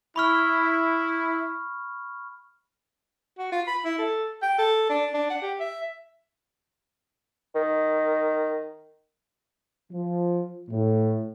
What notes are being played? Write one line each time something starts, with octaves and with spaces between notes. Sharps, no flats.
E4 B5 C#6 F6
F#4
F4
B5
E4
A4
G5
A4
D4
D4
F#5
G4
E5
D#3
F3
A2